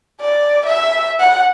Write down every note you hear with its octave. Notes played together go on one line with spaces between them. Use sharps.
D5
E5
F#5